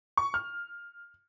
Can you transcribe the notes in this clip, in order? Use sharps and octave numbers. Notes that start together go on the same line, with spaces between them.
C#6
F6